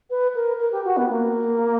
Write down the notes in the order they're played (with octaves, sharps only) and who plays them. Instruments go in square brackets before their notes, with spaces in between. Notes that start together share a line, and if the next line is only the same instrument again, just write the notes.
[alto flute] B4
A#4
A#4
G4
F#4
B3
A#3